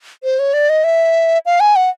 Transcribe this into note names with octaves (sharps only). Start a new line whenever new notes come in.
C5
C#5
D5
D#5
E5
F5
G#5
F#5